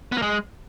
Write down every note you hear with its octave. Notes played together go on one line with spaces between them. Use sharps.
B3
A#3
G#3